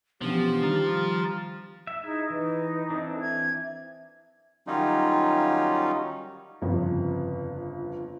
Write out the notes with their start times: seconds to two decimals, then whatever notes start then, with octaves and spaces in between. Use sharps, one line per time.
0.21 B2 E3 F3 B3 C#4 D4 G4
0.62 D#3 G3 A#5 F6 A6
1.87 E5
2.04 D#4 E4 G#4
2.30 E3 D#4 B4
2.90 E3 C4 D4 A4
3.21 E5 G#6
4.67 D#3 F#3 G3 C#4 D#4 F4
6.62 G1 F2 C#3